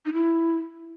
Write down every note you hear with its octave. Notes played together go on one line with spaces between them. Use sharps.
D#4
E4